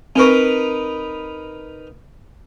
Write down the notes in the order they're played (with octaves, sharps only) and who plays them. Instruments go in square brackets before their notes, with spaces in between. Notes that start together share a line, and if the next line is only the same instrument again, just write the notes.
[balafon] C4 C#6 [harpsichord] D#4 A#4 B4